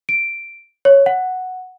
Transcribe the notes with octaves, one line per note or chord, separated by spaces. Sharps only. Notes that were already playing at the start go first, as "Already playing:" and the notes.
D7
C#5
F#5